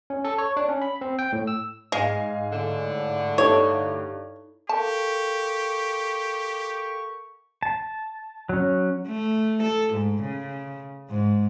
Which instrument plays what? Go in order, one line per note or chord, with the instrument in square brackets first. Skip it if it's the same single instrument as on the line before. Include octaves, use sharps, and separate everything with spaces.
[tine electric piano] C#4
A4
C#5
D4
C#4
B5
C4
G5
A2
E6
[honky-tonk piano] G#2 F5 G#5 [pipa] G#3
[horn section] A2 D3
[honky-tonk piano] G2 [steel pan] D#4 E4 A4 [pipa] C#5
[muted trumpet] G4 [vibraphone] A4 A#4 F5 [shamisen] A5 [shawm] C#6
[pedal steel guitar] A5
F#3 C#4
[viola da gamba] A3
A4
G#2
C#3
G#2